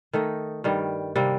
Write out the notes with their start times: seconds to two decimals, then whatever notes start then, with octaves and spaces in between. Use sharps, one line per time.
0.13 D#3 A3 D#4
0.64 G2 D#3 G3
1.16 C3 G3 A#3